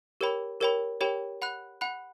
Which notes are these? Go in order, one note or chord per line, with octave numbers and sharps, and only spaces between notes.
G4 A#4 C#5 G5 B5
G4 A#4 C#5 G5 B5
G4 A#4 C#5 G5 B5
F#5 B5 F#6
F#5 B5 F#6